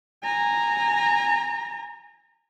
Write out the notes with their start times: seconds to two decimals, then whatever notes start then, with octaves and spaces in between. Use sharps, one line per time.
0.24 G#5 A#5